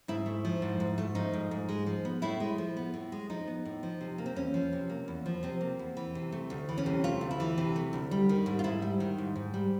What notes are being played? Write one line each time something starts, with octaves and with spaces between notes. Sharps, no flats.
G#2 E4
A3
F3
G#2
G#2
A3
F3 D#4
G#2
G#2
G#3
F3
B3
A2 E4
G#3
F3
B3
A2
G#3
F3 D#4
B3
A2
F3
C3
A#3
C4
E2 C#4
F3
C3
A#3
E2
F3
C3 C4
A#3
E2
E3
C3
A3
D2
E3
C#4
C3
A3 F4
D2
E4
E3
C3
A3
D2
G3
D#3
G#2
F4
G#2 E4
G3
D#3
G#2
G#2
G3